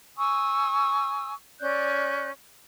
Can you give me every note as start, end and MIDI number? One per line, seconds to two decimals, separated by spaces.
0.17 1.34 80
0.17 1.34 85
0.17 1.34 87
0.17 1.34 88
1.60 2.29 61
1.60 2.29 74
1.60 2.29 90
1.60 2.29 91